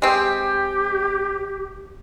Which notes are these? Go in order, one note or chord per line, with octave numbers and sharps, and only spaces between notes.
G#3 C4 G4